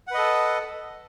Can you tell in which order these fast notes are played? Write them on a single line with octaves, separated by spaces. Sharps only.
F#5 B4 D#5 A4